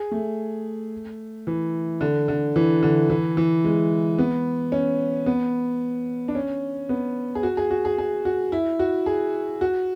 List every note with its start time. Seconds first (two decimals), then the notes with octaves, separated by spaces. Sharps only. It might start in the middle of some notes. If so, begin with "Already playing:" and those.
Already playing: G#4
0.12 A3
1.47 E3
2.01 D3
2.28 D3
2.56 E3
2.83 D3
3.10 E3
3.37 E3
3.64 G#3
4.18 B3
4.72 C#4
5.26 B3
6.28 D4
6.35 C#4
6.89 B3
7.35 G#4
7.43 F#4
7.57 G#4
7.71 F#4
7.85 G#4
7.98 G#4
8.25 F#4
8.52 E4
8.79 F#4
9.06 G#4
9.61 F#4